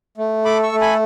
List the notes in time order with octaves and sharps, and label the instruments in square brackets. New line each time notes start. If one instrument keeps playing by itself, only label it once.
[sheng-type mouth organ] A3
A4 B5 D6
C#6 E6
A3
G#5 B5